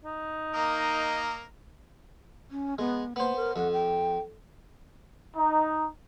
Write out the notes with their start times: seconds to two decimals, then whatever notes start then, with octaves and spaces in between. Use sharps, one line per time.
0.05 D#4
0.54 A#3 A#4 D#5
2.50 C#4
2.78 G#3 B3
3.16 A#3 B3 C5
3.36 A#4
3.56 F2 F#5
3.73 G5
5.36 D#4